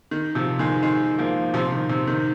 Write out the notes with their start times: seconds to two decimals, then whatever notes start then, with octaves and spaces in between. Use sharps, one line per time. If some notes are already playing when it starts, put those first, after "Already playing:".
0.11 D#3
0.35 C3 F3
0.59 D#3 G#3
0.83 D#3 G#3
1.18 F3 A#3
1.54 C3 F3
1.72 D#3
1.89 C3
2.07 D#3